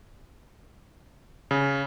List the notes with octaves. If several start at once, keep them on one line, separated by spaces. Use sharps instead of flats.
C#3